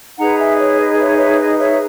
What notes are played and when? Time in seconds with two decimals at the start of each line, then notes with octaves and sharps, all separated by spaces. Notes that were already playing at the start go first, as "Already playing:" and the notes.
0.19 D#4 G#4 B4 F#5 A#5
0.39 E5 G#5
0.54 D#5
0.59 C#5
0.80 D#5
0.99 C#5 E5
1.18 C#5 E5
1.39 D#5
1.59 C#5 E5